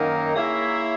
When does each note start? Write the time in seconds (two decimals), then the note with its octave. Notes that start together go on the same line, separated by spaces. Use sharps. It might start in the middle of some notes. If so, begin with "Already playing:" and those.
Already playing: F#2 D#3 A#3 D#4
0.35 A#3 E4 G#4 C#5 E5